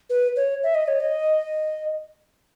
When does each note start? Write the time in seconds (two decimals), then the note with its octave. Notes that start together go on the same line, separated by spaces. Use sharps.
0.10 B4
0.36 C#5
0.63 E5
0.75 D#5
0.88 C#5
1.00 D#5